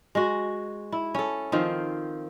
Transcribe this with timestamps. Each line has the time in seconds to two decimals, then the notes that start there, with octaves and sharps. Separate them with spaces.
0.15 G#3 F#4
0.92 E4
1.14 C#4 A4
1.52 D#3 F3 C4